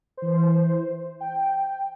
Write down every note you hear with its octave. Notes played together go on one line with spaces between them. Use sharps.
E3 C5
G5